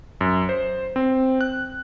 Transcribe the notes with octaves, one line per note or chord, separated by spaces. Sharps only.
F#2
C5
C4
F#6